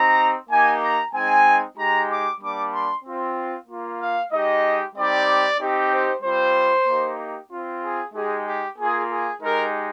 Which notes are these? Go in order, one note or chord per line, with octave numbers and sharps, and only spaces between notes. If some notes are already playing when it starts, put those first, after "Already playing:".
Already playing: C4 D#4 G4 A#5
A#3 D#4 G4 G#5
A#5
G#3 C4 D#4 G#5
G#3 D#4 G4 A#5
D6
G3 A#3 D4 D6
C6
C4 F4
A#3 F4
F5
G#3 D#4 G4 D#5
G3 C4 D#4 G4 D5
C4 D#4 G4
C5
G3 C4 F4 C5
A#3 D#4 G4
C4 F4
G#4
G#3 D#4 G4 G#4
G4
A#3 F4 G#4
G#4
G#3 D#4 G4 A#4